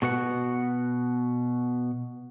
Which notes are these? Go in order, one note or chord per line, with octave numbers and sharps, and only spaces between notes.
B2 F#4 B4 F#5